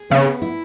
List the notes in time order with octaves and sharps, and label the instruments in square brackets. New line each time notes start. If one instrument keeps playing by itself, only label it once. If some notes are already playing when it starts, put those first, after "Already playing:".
Already playing: [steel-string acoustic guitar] G#4
[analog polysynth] C#3 [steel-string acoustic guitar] B3
[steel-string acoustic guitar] E4